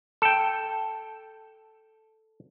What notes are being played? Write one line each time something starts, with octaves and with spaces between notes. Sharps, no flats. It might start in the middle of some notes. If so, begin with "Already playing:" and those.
A4 G5